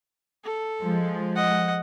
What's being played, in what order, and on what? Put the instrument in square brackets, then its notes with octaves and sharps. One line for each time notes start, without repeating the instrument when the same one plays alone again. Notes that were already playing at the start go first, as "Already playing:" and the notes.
[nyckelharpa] A4
[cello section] F3 G#3
[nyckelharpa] D#5 F#5